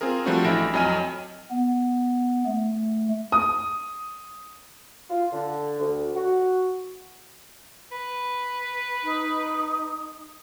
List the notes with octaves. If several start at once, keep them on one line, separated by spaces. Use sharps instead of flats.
C4 F4 G#4 A#4
F3 G3 A3 C4 D4 F#4
A1 E4 E5 B5 A#6 D7
F2 F#3 D#5 G#5 F6 D#7
B3
A3
D#6
F4
D3
D2
F#4
B4
D#4